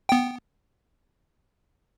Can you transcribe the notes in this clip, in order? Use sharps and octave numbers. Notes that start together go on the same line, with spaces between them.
B3 G5